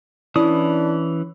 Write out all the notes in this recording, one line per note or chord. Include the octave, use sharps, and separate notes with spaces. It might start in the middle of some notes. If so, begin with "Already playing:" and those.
E3 C#4 D4 E4 D#6